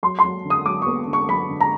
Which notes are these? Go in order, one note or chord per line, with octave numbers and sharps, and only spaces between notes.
F#3 C6
C6
F#3
D3
D#6
F#3 D6
B3 C#6
D3
C#6
F#3 B5
D3
A#5